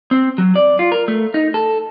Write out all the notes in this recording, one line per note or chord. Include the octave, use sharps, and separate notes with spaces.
C4
F#3
D5
F4
A#4
A3
D#4
A4